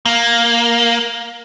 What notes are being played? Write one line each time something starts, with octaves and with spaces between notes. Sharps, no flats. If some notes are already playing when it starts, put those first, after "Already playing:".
A#3